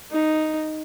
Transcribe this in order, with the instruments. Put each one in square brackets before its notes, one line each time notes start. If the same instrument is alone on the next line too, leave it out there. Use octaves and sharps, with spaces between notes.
[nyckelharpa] D#4